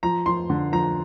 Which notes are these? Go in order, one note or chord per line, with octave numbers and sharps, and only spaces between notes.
F3 A#5
F3 C6
D3
F3 A#5